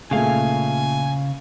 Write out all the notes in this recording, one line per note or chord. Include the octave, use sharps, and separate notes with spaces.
A#2 C#3 A3 G#4 F5 G#5